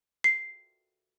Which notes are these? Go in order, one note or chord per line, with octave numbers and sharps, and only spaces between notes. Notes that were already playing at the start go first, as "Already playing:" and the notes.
C7